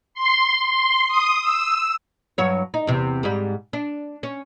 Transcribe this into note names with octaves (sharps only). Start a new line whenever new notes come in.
C6
C6
D#6
E6
G2 F#3 C#5
D#4
E2 C3
G#2 G3
D4
C#4